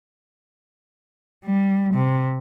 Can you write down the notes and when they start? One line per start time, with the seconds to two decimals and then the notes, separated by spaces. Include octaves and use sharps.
1.45 G3
1.94 C3